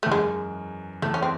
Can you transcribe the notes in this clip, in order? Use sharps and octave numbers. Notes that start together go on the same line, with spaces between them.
A3
E2
F#2 G#3
E2 A3
C#4
C4